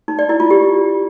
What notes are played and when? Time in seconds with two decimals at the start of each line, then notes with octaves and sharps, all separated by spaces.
0.08 D#4
0.19 D5
0.29 E4
0.40 F4
0.50 G4